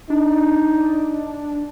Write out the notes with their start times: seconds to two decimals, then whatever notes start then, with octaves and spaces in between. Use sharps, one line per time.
0.10 D4 D#4